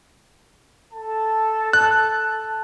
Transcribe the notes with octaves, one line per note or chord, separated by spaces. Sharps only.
A4 A5
F#6